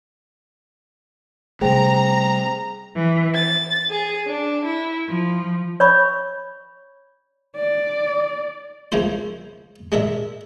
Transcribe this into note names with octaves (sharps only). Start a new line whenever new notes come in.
C3 G3 A3 G#4 C5 G5 A#5
E3
A6
G#4
D4
E4
F3
C#5 D5 B5 C#6
D5
C#2 C#3 F3 A#3 E4 C5
G#3 D4 A#4 E5